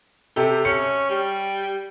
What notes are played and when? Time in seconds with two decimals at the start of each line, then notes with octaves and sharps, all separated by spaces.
0.36 C3 G4 A4
0.65 C#4 C#7
1.10 G3